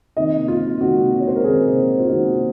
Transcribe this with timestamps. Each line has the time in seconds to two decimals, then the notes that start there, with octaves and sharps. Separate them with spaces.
0.16 C3 D#3 A#3 D#4 D#5
0.48 F4
0.80 C3 D#3 A#3 D#4 F#4
1.20 C#5
1.28 C5
1.36 A#4
1.44 C3 D#3 A#3 D#4 G#4
1.99 F4
2.07 C3 D#3 A#3 D#4 F#4